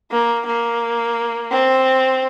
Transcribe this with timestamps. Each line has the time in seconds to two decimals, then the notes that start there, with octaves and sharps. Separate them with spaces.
0.11 A#3
0.46 A#3
1.51 C4